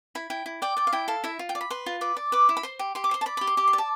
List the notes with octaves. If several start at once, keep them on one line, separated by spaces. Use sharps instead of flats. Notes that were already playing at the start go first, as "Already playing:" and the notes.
E4 B5
E4 G5
E4
D5 G5
D5 G5
F5
E4 G5
A4 F5
E4 E5
F4
G5
D5
B5
B4 C6
F4
B4 D6
D5
B4 D6
E4
B5
C5 C6
G4
G4 C6
D6
C5 C6
A5
D5 B5
G4 B5
C6
G4 D6
C6
D5
A5